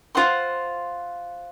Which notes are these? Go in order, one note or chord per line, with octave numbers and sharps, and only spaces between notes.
F4 C5 F#5 C6